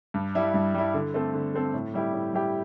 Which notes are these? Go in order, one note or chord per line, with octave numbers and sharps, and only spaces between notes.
G2
G3 E4
G2
G3 E4
D3
A3 C4 A4
D3
A3 C4 A4
A2
G3 E4 G4
A2
G3 E4 G4